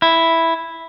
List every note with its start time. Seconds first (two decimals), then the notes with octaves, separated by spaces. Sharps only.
0.02 E4